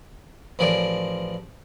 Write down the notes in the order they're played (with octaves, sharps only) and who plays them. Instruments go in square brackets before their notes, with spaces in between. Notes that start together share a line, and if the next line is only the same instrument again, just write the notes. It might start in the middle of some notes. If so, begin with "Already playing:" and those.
[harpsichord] A1 F3 G#4 A#4 D5